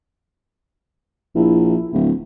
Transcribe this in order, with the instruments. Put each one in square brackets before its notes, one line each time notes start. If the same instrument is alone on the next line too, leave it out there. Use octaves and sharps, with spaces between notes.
[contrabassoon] A#1 [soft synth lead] E4
[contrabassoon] D1